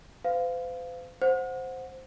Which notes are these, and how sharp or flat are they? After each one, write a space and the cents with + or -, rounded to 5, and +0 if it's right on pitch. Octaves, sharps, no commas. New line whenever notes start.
C5 -45 F5 +0
C5 +0 F#5 -20